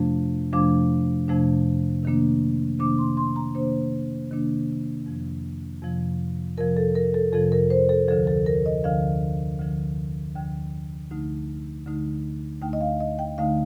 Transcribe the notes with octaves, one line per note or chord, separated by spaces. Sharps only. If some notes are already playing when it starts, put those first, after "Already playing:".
Already playing: F2 C3 F3 A3 D4
F2 C3 F3 A3 D4 D6
F2 C3 F3 A3 D4
C3 D#3 A#3 D4
C3 D#3 A#3 D4 D6
C6
C6
A#5
C3 D#3 A#3 D4 C5
C3 D#3 A#3 D4
F2 C3 F3
F2 C3 F3
F2 C3 F3 A#4
A4
A#4
A4
F2 C3 F3 A4
A#4
C5
A4
D2 D3 F3 A4
A4
A#4
D#5
D2 D3 F3 F5
D2 D3 F3
D2 D3 F3 G5
D2 D3 A3 D#4
D2 D3 A3 D#4
D2 D3 A3 D#4 G5
D#5
F5
D#5
G5
D2 D3 A3 D#4 F5